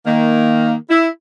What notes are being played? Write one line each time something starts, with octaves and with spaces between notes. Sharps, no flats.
D#3 A#3
E4